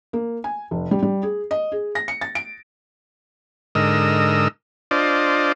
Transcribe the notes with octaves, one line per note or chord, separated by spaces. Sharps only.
A#3
G#5
F1
G3
G3
G#4
D#5
G#4
A#6
C#7
A6
D7
G#2 D3 A#4 D#5 E6
D4 F4 C5 D5 D#5